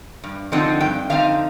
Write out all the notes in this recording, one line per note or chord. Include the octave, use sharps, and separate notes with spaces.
G2
D3 F3 C4 D#4
G2 G5
D3 F3 C4 D#4 F5